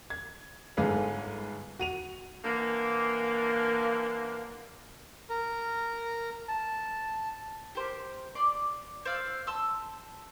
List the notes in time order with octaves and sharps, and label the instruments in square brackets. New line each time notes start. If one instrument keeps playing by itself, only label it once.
[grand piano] G#6
G1 G#2 D3 G#4 B4 F5
F#4 D#7 F7
[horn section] D3 E3 A#3
[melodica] A#4
A5
[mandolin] G4 A#4 C5
D5 C6
C5 D5 F5 E6
A5 C6 E6